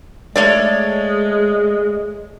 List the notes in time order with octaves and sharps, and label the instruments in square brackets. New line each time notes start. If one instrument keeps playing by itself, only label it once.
[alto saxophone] G#3 [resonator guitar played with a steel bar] A3 C#5 D5